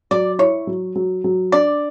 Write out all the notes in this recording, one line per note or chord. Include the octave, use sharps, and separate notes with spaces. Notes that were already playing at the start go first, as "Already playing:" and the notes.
F#3 D5
E4 C#5
F#3
F#3
F#3
D4 D5